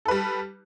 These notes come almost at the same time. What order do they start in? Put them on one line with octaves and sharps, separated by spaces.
A4 B4 G3